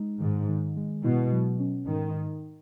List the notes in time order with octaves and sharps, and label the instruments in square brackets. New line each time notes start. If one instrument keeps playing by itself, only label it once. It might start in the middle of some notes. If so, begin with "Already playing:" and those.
Already playing: [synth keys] G#3 D#4
[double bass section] G#2 [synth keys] D#3
[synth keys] D#3
G#3
[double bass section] B2 [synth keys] E4
[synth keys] F#3
C#4
[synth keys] G#2 [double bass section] D#3